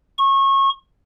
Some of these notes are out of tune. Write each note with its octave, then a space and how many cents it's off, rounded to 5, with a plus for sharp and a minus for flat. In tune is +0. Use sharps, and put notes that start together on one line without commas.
C#6 -25